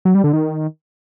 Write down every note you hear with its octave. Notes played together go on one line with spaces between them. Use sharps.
F#3
G3
D3
D#3